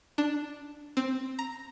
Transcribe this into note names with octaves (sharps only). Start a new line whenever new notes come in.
D4
C4
A#5